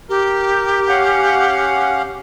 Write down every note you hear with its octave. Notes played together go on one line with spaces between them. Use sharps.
G4 A#4
C#4 F5 F#5